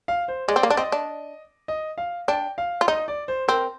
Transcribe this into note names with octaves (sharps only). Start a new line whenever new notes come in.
F5
C5
G#3 D5
C4
A#3
D4 D5
C4 D#5
D4
D#5
F5
D4 G5
F5
F4
D#4 D#5
D5
C5
C4 A#4